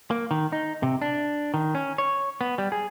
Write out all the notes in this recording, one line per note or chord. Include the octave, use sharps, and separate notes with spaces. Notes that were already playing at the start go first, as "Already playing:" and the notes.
A#3
D#3
D#4
C3
D4
D#3
C#4
C#5
B3
G3
G#4